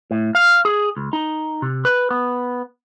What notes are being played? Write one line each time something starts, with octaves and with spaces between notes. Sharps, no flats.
A2
F5
G#4
C#2
D#4
C3
B4
B3